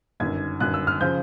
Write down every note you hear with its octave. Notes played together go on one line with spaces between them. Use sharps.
G1 F#2 D#3 G#6
G1 F#2 D#3 F#6
E6
F6
C#3 F3 G6